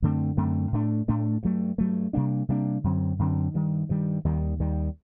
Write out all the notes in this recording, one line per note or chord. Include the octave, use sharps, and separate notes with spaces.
F#2 D3 A3 C4
F#2 D3 A3 C4
A2 A3 D4
A2 A3 D4
G2 F#3 A3
G2 F#3 A3
C3 G3 A#3 D4
C3 G3 A#3 D4
F#2 D3 F#3 C4
F#2 D3 F#3 C4
G2 D#3 G3
G2 D#3 G3
D#2 D#3 G3
D#2 D#3 G3